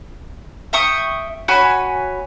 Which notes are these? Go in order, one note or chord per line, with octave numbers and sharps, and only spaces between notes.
E5 G5 C#6 D#6
F#4 C#5 G#5 B5